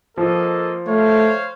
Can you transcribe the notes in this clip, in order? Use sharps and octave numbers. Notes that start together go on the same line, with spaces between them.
F3 A#3 A4 D#5
A3 C5 C#5 F5